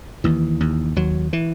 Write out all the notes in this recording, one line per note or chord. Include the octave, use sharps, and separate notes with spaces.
D#2 E3
D#2
D#2 F#3
E3